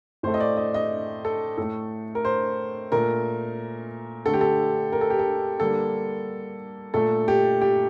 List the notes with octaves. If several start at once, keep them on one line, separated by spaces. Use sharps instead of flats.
A2 A3 C5
D#5
D5
D#5
D#5
A4
A2 A3 A4
A#4
C5
A#2 A3 A#4
D3 A3 A4
G4
A4
A#4
A4
G4
A4
D3 G3 A#3 A4
A#2 A3 A4
G4
G4